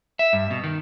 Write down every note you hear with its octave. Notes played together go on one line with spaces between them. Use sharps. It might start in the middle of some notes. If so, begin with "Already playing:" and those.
E5
G2
B2
D#3